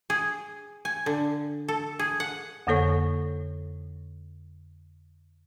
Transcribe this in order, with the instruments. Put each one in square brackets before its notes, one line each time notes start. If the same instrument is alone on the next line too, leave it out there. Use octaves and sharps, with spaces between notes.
[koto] G#4
G#5
D3
A4
G#4
F#5
[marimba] F2 D3 A#3 A4 C#5 C#6